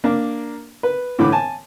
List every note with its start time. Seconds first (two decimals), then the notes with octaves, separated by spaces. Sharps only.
0.04 A#3 D4
0.83 B4
1.19 A2 D3 E3 B5 D6
1.32 G#5 A5